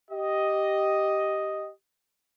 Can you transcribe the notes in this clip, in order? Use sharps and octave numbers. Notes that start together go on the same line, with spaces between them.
G4 D#5